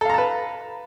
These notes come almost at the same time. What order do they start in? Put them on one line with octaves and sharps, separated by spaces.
A4 F5 A#5 A5 B4